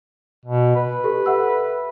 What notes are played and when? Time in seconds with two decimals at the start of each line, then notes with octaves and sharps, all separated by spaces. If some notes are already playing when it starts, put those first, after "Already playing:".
0.45 B2
0.75 B4
1.04 G4 A4
1.26 E5 F#5 E6